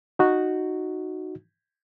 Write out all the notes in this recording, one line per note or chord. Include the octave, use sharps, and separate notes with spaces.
D#4 F#4